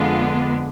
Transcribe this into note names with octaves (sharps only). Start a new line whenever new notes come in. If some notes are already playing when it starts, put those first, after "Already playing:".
Already playing: F2 D3 G#3 B3 F4